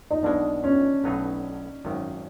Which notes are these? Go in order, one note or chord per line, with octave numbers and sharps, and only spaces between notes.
D#4
B1 B2 G#3 D4
C#4
B1 A2 F#3 B3 D#4
G#1 F#2 D#3